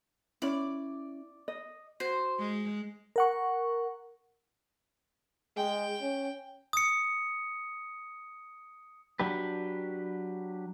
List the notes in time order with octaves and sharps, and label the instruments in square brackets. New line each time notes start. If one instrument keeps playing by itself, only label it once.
[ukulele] C#4 E4 [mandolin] D5
[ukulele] D#5
[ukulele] F#4 [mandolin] C5
[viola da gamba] G#3
[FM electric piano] A#4 F#5 C#6
[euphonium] G#3 [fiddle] G5
[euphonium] C#4
[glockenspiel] D#6 C#7
[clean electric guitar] F#3 D4 G4 B4